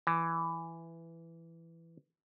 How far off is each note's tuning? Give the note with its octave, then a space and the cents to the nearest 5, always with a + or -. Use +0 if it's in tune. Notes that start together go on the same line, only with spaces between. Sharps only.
E3 +10